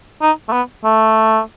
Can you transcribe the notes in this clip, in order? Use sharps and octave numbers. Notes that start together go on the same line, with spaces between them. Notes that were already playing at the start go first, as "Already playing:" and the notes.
D#4
A3
B3
A3